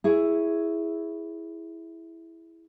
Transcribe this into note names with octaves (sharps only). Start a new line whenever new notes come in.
E4 G#4 C#5